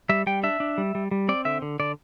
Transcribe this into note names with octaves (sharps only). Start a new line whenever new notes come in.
G3 E5
G3 G5
D4 E5
D4
G3
G3
G3
C4 D5
D3 E5
D3
D3 D5